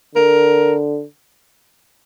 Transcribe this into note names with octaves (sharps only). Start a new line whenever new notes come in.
D3 A#4